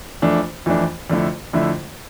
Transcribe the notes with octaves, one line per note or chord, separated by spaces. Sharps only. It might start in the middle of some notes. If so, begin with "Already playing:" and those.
F2 E3 A3 D4
F2 E3 A3 D4
F2 D3 A3 E4
F2 D3 A3 E4